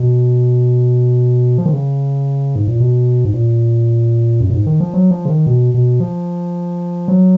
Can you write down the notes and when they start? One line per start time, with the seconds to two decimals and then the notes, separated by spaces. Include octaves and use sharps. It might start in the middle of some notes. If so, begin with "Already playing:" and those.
Already playing: B2
1.58 F3
1.66 D#3
1.73 C#3
2.56 G#2
2.67 A#2
2.80 B2
3.25 G#2
3.34 A#2
4.41 F#2
4.50 A#2
4.54 G#2
4.66 D#3
4.80 F3
4.94 F#3
5.11 F3
5.25 C#3
5.30 D#3
5.47 B2
5.74 B2
6.00 F3
7.08 F#3